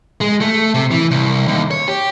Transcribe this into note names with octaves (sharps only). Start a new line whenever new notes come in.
G#3
A3
C3
E3
C2
D#2
C#5
G4